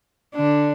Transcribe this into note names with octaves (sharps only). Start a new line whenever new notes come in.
D3 D4